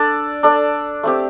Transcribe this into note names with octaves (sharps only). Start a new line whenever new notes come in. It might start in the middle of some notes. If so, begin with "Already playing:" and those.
Already playing: D4 A4 D5
D4 A4 D5
A3 C4 G4